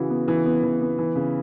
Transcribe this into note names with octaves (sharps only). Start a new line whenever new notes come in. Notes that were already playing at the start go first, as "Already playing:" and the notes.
Already playing: C#3 E3 F#4
B3
E3
B3
E3
B3
E3
C#3